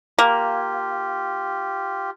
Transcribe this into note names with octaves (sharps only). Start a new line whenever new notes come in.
A#3 F4 G4